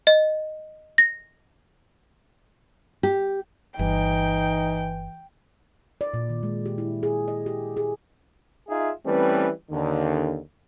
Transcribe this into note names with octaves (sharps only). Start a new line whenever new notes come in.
D#5
A#6
G4
G1 E3 D#4 G5
D5
A#2
D#3
G#3
G4
E4
G#4
D#5
G4
G#4
D#4 F4 G#4 E5
E3 G3 A3 C4 C#4 B4
D#2 D3